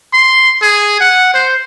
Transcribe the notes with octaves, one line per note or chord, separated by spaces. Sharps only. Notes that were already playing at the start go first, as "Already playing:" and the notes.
C6
G#4
F#5
C5